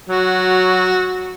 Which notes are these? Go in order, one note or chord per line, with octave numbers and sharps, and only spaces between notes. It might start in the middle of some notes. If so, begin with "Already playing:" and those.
F#3 F#4